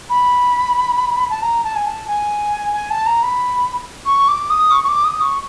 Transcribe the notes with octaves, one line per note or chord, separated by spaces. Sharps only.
B5
A5
A#5
A5
G#5
A5
G#5
G#5
A5
A#5
B5
C#6
D6
D#6
C#6
C#6
D6
D#6
C#6